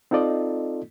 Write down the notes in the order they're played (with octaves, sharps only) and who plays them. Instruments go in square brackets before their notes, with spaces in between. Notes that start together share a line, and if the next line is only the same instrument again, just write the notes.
[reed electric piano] C4 D#4 F4 A4 D5 D#5